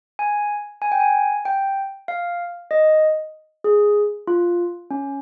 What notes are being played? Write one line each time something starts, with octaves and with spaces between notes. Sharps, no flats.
G#5
G#5
G5
G#5
G5
F5
D#5
G#4
F4
C#4